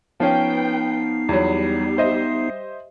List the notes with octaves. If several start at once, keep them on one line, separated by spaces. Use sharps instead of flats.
F3 B3 C#4 D#4 B4 G5 C7
E2 F#3 G3
C5 D#5 E5